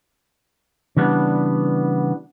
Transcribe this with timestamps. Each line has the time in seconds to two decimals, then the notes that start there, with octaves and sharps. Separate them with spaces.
0.97 C#3 E3 G3 B3 D4